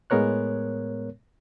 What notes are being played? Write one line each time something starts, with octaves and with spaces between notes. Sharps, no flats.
A2 G#3 B3 A#4 C#5 F#6